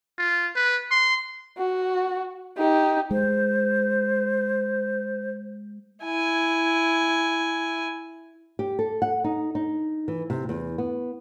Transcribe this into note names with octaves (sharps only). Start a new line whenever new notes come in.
F4
B4
C6
F#4
D#4 G4
G#3 C5
E4 G#5
G4
A4
F#5
D#4
D#4
E3
C3
E2
B3